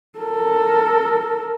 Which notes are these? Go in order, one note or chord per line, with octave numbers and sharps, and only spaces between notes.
A4 A#4